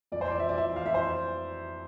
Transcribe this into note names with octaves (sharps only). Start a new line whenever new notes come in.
F2 D5
C5
E3 D5
E5
F2 D5
E5
E3
F5
F2 E5
C5